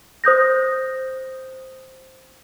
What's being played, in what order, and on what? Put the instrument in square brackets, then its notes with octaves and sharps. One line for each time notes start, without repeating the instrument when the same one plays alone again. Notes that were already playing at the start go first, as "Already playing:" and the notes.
[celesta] C5 D#6 G6 A#6